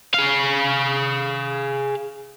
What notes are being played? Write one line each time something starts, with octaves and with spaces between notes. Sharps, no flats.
G#4 F5